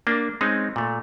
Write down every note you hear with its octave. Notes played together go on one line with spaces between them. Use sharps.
A#3 D4
G#3 C4 C#4 D#4
A#2 A3